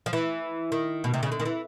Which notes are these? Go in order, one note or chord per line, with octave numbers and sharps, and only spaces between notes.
F3
E3
D#3
B2
C3
C#3
D3
D#3
E3